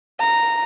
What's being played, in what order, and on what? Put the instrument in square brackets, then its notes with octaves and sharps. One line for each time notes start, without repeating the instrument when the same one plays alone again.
[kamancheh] A#5